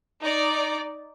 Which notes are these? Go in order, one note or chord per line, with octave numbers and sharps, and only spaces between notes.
D#4 D5